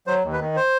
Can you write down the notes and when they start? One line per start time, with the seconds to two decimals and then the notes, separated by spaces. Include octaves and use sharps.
0.07 F#3 C5
0.24 D#2
0.33 B4
0.41 D#3
0.56 C5